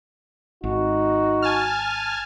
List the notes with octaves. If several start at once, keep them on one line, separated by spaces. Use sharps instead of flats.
G#1 D#4 F#4
G#5 A5 F6